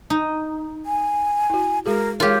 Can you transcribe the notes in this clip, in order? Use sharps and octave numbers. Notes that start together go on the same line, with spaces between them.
D#4
G#5
E4 F#4
G#3 F#4 G#4 A#4
G#3 F4 G4 G#4 A#4 C#5